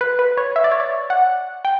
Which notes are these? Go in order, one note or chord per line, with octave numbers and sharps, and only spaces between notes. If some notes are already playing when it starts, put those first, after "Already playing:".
B4
B4
C#5
E5
D5
C#5
D5
F#5
G5